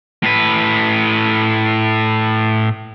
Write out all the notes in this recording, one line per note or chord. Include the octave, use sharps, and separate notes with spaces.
A2 B4